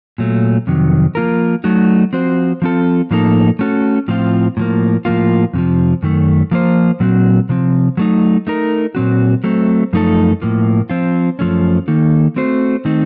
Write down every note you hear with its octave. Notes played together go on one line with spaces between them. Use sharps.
A#2 F#3 A3
F2 C3 D#3 F#3
F3 A#3 F4 A#4
F#3 A3 D#4 F#4
F3 C4 F#4 C5
F3 C4 F4 A4
A2 F3 A#3 D#4 A4
A3 C#4 F#4 A4
A2 F3 C4 F4
A2 F3 A#3
A2 F3 A#3 F4
F2 C3 F3
F#2 D#3 A3
F3 A#3 F4 C5
A#2 F#3 C4 F#4
C3 F3 C4
F#3 A3 D#4
A3 D#4 A#4
A#2 F#3 C4 F#4
F#3 A3 C4
F#2 F3 A3 D#4 A4
A2 F3 A#3
F3 C4 F4
F#2 F3 A3 C#4
D#3 A#3 D#4 A4
A3 C4 F#4 C5
D#3 A3 C4 D#4